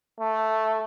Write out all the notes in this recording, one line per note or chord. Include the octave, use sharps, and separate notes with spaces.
A3